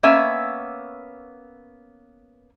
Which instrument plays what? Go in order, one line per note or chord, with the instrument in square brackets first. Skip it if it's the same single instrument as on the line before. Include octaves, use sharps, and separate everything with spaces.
[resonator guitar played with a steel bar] A#3 B3 C#4 E5 G#5